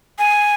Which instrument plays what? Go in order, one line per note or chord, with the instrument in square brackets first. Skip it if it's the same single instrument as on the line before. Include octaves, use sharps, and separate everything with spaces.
[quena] G#5